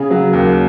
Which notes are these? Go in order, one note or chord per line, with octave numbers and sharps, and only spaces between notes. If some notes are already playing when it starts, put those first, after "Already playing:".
Already playing: C#3 G#4
F#3
D#2